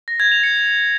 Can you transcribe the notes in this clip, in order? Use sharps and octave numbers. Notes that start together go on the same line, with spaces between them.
A#6
G#6
F7
C#7